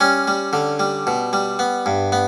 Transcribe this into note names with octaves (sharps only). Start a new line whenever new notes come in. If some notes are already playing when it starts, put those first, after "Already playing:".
G3 C#4
G3
D3
G3
B2
G3
B3
G2
B3